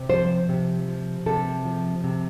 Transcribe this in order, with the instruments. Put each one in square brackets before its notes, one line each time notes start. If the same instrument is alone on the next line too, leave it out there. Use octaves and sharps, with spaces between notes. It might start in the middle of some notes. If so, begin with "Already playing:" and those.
Already playing: [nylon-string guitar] C3
F3 C5
C3
F3
C3 A4
F3
C3